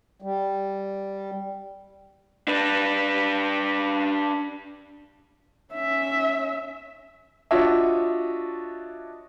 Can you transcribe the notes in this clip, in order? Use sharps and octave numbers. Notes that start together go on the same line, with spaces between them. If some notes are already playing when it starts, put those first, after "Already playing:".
G3
D4 B4
C#4 E5
D4 F4 F#4 C#5 D#5 E5